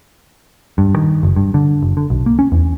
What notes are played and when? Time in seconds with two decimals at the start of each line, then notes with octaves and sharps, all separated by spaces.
0.78 G2
0.96 D#3
1.23 F#1
1.36 G2
1.54 D3
1.82 F#1
1.97 D3
2.10 B1
2.26 A#3
2.39 C#4
2.52 E2